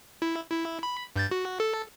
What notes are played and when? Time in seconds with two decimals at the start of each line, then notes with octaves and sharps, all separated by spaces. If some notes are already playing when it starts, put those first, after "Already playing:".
0.22 E4
0.51 E4
0.83 B5
1.16 G2 G6 A6
1.31 F#4
1.60 A4